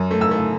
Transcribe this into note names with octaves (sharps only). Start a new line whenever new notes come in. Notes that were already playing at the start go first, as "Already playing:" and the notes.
Already playing: F#2
A3
E6
A3